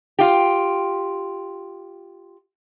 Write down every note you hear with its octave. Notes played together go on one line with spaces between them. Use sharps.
F4 G4